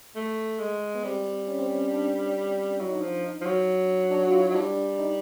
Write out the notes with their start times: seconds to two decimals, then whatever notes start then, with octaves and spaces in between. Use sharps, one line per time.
0.16 A3
0.59 G#3
0.95 B3
1.04 G3 C4
1.48 C#4
1.59 C4
1.71 C#4
1.91 D4
2.79 F#3 E4
2.88 D#4
2.95 D4
3.01 F3 D#4
3.24 D#4
3.41 F3
3.46 F#3
4.11 D4
4.23 F#4
4.31 F4
4.40 E4
4.48 F#3 D#4
4.56 G3 D4
4.99 D#4